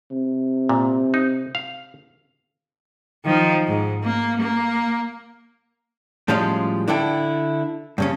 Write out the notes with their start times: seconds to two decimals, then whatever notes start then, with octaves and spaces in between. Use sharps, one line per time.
0.11 C3
0.69 A#2
1.14 D#4
1.55 F5
3.25 D#3 F3
3.68 G#2
4.04 A#3
4.40 A#3
6.28 A2 F3 G3 G#3 C#4 F4
6.88 D3 D4 E4 A4 G5
7.98 G2 C#3 C#4